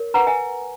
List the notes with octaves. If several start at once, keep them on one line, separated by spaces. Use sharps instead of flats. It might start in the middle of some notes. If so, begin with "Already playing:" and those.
Already playing: A#4 C#5
B4 F#5 A#5
E5 G#5